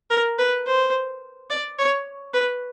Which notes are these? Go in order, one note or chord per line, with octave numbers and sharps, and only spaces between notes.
A#4
B4
C5
D5
C#5
B4